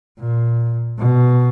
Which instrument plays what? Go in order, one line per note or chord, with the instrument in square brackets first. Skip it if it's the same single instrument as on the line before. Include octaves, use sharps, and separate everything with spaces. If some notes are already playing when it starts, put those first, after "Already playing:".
[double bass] A#2
B2